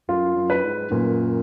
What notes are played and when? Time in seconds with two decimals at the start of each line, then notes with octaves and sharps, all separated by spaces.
0.09 F#2 F4
0.36 F#2
0.50 B4
0.64 G#2
0.91 F#2 A#2